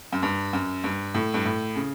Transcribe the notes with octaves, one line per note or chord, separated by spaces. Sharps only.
F#2
G2
F#2
G2
A2
G2
A2
C#3